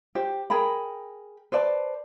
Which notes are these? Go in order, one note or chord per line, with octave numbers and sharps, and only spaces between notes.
G4 C5
G#4 A#4 G5 B5
B4 C5 D5 A5